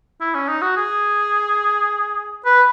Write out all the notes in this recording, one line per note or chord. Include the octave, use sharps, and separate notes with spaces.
E4
C#4
D#4
F#4
G#4
B4